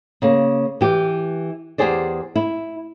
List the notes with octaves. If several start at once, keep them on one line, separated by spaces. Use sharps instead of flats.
C#3 A#3
E3 G4
E2 C#3 G4 G#4 C5 D5
E4